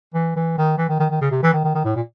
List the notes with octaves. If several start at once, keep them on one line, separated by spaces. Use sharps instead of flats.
E3
E3
D#3
E3
D#3
D#3
D#3
C#3
C3
E3
D#3
D#3
D#3
A2
A#2